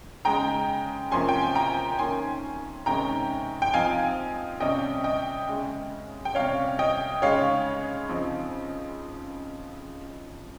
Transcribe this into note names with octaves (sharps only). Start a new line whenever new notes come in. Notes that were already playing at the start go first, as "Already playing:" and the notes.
C#3 G#3 D#4 G5 A#5
C3 F3 A#3 C#4 G#5 C6
G5
G#5
G5 A#5
D#3 A#3 C#4 G#5 C6
C3 D#3 G#3 C#4 G5 A#5
G5
F3 C4 D#4 F5 G#5
C3 G3 C#4 D#5 G5
D#5 G5
C#3 G#3 C#4
G5
C3 G3 C#4 C#5 F5
D#5 G5
C#3 G#3 D#4 C#5 F5
C#3 F3 C4 D#4